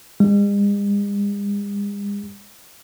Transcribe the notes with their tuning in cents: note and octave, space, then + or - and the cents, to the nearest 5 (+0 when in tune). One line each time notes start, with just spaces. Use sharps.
G#3 -45